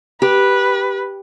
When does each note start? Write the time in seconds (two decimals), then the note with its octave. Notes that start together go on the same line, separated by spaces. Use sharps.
0.22 G4 B4